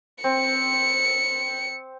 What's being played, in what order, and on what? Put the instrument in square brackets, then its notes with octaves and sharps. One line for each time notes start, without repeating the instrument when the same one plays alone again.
[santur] C4 [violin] C#7